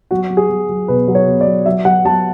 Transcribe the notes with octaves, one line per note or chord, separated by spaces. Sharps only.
F#3 F#4
F#3
G#4
F#3
F#3
B2 B4
F#3
C#5
B2
D5
F#3
F#3 E5
F#3 F#5
F#3 A5